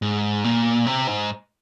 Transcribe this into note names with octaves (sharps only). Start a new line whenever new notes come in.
G#2
A#2
C3
G#2